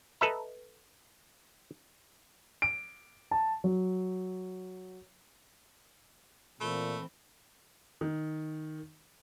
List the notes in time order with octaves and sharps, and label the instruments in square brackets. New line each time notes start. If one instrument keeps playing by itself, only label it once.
[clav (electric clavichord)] A4 B4 D#5 E5 A#5
[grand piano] D7
A5
F#3
[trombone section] A#2 [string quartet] E3 C4 [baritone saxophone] A3 [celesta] B5 G7
[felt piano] D#3